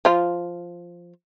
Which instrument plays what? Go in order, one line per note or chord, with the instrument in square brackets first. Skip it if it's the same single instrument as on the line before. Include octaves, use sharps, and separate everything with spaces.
[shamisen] F3 F4